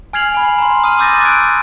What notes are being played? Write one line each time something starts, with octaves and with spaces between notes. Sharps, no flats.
G#5 F6 G#6 C7 F7 F#7
G#5 B5
A#5 C6
D#6 F6 D#7
D6 E6 G6 A6 A#6 D#7
D6 F#6 G#6 D7